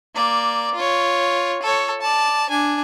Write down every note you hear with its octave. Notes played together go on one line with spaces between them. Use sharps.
A#3 D5
F4 C#5
A4 C#5
D5 A5
D4 G#5